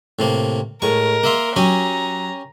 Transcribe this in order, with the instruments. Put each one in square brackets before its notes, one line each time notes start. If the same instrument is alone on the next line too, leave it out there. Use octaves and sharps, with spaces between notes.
[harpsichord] A2 C3 A#3
[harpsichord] A2 C#6 [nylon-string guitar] G#3 [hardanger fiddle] A#4
[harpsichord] A#3 E5 C6
[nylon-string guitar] F#3 [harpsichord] C#4 G4 G#5 [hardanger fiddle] A#5